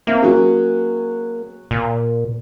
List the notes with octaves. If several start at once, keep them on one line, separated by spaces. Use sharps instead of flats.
A#3 C4 E5 F5
F#3 C#4 G#4
A#2